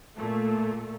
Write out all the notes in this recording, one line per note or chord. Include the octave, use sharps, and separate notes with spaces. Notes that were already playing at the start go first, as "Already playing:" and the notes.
A#2 A3